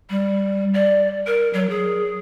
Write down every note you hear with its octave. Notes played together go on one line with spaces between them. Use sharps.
G3
D5
A#4
F#3
G#4